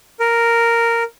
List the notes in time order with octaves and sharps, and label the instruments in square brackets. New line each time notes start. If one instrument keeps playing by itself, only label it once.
[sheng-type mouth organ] A#4